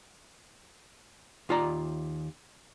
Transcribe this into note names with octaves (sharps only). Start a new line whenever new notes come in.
D#2 F4 D5 A#5